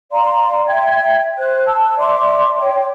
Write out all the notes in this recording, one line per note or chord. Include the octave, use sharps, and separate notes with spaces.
D5 F5 A#5 C6
E5 G5 G#6
C5 F#6
A5 E6
D5 E5 C6 D6
C#5 G5